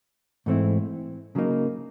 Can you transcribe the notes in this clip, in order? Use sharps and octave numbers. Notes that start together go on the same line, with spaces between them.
G#2 E3 A3 C4 E4
C#3 F#3 A#3 D#4